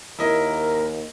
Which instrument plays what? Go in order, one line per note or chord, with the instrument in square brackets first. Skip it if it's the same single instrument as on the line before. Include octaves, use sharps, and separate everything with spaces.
[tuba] D#2 [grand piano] E4 D#5 [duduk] A#4